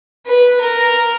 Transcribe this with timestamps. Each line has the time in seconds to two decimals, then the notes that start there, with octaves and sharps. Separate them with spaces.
0.26 B4
0.61 A#4